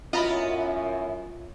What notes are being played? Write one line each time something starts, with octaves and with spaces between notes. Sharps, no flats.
F#2 B3 E4 F4 D#5 A#5 B5